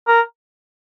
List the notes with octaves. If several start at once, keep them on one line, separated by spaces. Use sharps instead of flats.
A#4